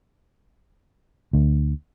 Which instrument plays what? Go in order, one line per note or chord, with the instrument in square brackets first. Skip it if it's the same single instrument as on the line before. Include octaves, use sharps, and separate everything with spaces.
[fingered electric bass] D2